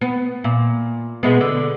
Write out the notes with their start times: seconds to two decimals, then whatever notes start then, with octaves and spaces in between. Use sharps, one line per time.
0.01 B3
0.44 A#2
1.23 B2 G#3 B3
1.41 D3